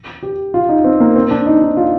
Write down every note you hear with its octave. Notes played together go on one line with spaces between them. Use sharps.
G4
F4
D#4
C4
A#3
C4
D4
D#4
D#4
F4